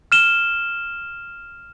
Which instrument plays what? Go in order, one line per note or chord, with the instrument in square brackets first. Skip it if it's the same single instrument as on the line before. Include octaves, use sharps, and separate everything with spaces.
[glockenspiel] F6 E7 G7